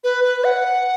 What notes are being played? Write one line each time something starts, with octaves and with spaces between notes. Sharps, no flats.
B4
B4
F#5